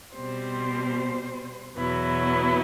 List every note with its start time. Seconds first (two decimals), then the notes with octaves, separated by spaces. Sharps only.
0.15 B2 G3 C4 C5
1.76 E2 B2 F#3 B3 E4